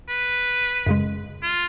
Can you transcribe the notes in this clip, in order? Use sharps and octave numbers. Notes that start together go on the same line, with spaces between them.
B4
F#2 C#3 G#3
F4